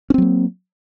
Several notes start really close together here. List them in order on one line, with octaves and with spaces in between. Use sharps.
C#4 C4 F#3 A#3